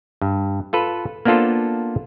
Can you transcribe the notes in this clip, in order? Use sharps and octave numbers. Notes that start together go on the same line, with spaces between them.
G2
F4 A4 B4
A#3 B3 D4 F4 A4 C5